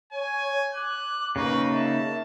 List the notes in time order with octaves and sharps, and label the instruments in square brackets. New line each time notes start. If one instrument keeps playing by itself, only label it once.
[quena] C#5 [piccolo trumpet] G#5
[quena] D6 [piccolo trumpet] F#6
[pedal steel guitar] C#3 A#3 D#4 [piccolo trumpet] B4 [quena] C#6
[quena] E5 [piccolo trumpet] A5